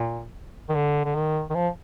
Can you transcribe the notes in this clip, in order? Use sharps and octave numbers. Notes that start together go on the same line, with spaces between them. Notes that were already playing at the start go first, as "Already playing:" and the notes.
Already playing: A#2
D#3
D3
D3
D#3
D#3
F3